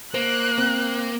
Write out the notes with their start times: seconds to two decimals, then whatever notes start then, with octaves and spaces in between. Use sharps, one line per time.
0.14 A#3 C5 F#6
0.58 C4